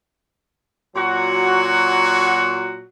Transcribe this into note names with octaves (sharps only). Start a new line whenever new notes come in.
A#2 F#3 F#4